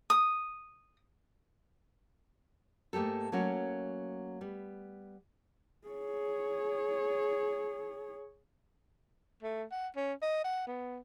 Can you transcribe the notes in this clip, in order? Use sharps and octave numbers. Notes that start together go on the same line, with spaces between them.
D#6
G#2 A3 A#3 G4 A4
F#3 A3 A#3 C#4 F#4
G3 B3
G#4 C#5
A3
F#5
C#4
D#5
F#5
B3